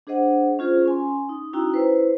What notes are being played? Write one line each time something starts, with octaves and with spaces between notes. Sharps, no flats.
D4 G#4 C5 D#5 F#5
C#4 F4 G#4 C5
C#4 G#5 C6
D#4
C#4 D#4 E4 F#4 G5 A#5
E4 B4 C5